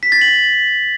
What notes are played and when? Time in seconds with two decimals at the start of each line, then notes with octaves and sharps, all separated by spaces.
0.03 B6
0.12 A6
0.21 F#7